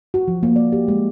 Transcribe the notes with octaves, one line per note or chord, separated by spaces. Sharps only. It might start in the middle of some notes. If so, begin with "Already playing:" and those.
F#4
F3
A#3
D5
G4
G#3